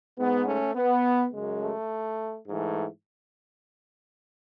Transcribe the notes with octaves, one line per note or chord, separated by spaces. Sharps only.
G#2 G#3 B3
A3 C#4
B3
F#2 C#3 G#3
A3
G#2 E3 A3